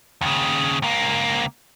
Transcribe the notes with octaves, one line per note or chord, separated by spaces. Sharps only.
D#2 C#3
C#2 A#3